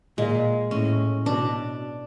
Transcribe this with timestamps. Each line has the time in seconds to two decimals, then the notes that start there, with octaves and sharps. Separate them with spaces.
0.18 A#2 G#3
0.71 A2 C#4
1.25 B2 D4